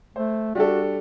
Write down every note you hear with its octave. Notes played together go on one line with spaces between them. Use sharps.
A3 C5
G3 D4 F#4 A4